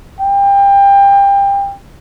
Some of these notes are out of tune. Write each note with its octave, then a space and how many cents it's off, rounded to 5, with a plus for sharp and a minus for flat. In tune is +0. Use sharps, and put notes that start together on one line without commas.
G5 +25